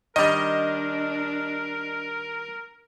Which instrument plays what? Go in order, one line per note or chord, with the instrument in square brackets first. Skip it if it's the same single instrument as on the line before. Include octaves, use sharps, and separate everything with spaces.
[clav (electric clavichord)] D#3 G3 [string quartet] D4 [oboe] A#4 [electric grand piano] D#5